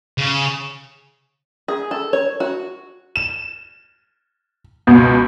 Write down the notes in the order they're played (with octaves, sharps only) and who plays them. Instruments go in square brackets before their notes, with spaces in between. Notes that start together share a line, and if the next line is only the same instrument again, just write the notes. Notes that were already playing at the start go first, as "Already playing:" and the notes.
[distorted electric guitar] C#3
[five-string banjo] G#4
A4
C#5
F#4
[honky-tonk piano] E7
C#2 B2 B3